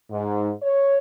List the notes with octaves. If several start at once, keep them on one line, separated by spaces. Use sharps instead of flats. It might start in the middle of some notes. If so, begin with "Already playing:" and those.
G#2
C#5